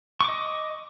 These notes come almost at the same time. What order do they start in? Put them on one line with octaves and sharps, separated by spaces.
C#6 D6 D#5